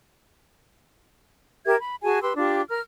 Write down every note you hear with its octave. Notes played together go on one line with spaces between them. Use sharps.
G4 A#4 E5 G#6
B5
F#4 G#4 G#5 A5
G4 B4 C6 E6
D4 F4 G4
A#4 F6